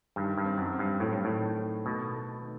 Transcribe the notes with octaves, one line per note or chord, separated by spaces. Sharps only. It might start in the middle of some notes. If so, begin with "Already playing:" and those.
G2 D#3
G2
C4
F#2
C4
G2
A2 F#3
G2
A2 D#3
D#3
B2 A3
A3
D#3